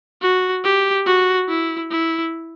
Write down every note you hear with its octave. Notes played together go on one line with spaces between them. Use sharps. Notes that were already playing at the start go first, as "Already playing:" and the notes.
F#4
G4
F#4
E4
E4